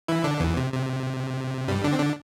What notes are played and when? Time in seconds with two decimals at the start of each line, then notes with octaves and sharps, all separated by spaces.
0.08 E3 E4
0.24 D3 D4
0.40 E2 E3
0.57 C3
0.72 C3
1.68 G2 G3
1.84 D3 D4
1.93 C4
1.99 D3 D4